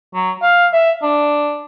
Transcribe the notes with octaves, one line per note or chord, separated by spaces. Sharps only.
F#3
F5
E5
D4